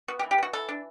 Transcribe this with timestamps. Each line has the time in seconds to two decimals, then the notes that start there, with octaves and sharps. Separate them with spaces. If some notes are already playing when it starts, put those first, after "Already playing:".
0.08 B3 F#4
0.19 G4
0.23 E3
0.31 G4
0.38 B3 F#4
0.53 E3 A4
0.69 D4